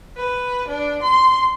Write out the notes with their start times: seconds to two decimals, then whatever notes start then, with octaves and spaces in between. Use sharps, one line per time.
0.16 B4
0.68 D4
1.02 C6